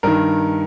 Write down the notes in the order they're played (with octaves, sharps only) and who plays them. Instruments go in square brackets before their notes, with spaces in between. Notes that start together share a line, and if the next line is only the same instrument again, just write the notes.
[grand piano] G2 D#3 A#4